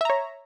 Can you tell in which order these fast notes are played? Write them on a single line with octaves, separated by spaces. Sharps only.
E5 A#5 C#5